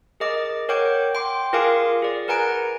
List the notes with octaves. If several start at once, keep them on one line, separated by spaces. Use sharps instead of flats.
G#4 A#4 D#5 D6 A6
A#4 C#5 F#5 G5 D6 G6
G5 C6 D6
F4 G#4 A#4 F5 G#5 D6
G#4 D5
A#4 B4 F#5 G#5 A#5 D7